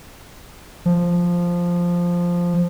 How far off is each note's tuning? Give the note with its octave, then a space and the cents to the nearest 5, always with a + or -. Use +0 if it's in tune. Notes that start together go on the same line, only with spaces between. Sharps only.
F3 +0